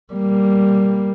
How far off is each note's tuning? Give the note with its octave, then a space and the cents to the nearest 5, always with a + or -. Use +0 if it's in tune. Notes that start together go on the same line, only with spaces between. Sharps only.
G3 +0 A#3 +0